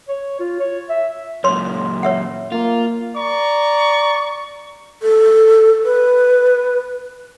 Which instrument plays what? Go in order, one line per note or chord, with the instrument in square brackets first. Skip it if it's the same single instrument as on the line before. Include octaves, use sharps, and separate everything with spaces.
[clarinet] C#5
F4
C#5
E5
[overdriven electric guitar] F#2 A#2 [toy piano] C#5 C6
[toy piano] C#5 E5 F#5
[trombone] A#3 [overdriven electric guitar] F4
[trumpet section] D5 A#5 C#6
[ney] A4
B4